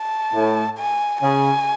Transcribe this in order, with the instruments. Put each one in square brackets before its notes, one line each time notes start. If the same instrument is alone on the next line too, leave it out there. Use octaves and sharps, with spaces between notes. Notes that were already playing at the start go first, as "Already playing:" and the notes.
Already playing: [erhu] A5
[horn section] A2
[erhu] G#5
[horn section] C#3 [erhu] G#5